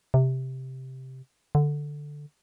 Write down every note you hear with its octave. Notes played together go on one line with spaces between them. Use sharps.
C3
D3